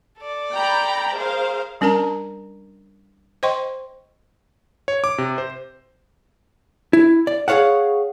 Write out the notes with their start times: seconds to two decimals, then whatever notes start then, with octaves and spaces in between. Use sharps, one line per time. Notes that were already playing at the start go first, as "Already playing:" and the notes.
0.18 A4 D5
0.54 G5 A#5 B5
1.15 G#4 A#4 C5 F5
1.81 G3 C#4 D4 A#4 A5 A#5
3.43 C5 D#5 G5 C6 C#6
4.88 C#5
5.04 D6
5.18 C3
5.38 C5
6.93 E4
7.27 D5
7.48 G#4 A4 C#5 F5 F#5